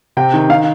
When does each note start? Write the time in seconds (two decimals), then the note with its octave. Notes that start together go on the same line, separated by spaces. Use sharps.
0.17 C3 G5
0.34 D#3
0.49 D#3 F5